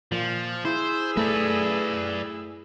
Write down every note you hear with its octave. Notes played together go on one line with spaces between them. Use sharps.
A#2 F3
E4 G#4 C5 E6
A3 B4 D5